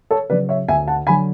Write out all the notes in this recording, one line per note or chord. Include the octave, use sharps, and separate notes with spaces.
A4 C#5
C#3 F#3 B4 D5
C#5 E5
D2 E5 G#5
F#5 A5
D3 F#3 G#5 B5